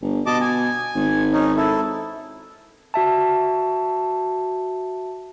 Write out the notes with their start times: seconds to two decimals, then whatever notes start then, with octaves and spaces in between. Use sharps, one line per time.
0.01 G1
0.26 B2 D#5 A5 D6
0.41 G#5
0.95 G#1
1.33 C#4 D#4
1.57 E4 A4
2.94 F#4 E5 A5